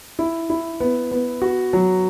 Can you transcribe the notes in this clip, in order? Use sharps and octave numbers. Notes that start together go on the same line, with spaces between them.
E4
E4
B3
B3
F#4
F#3